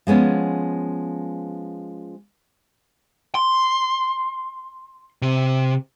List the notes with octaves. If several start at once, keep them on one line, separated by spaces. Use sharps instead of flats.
F3 G#3 B3 C#4
C6
C3